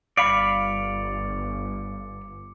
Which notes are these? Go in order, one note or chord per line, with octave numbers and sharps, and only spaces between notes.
G1 D5 F5 B5 D6 C#7 D7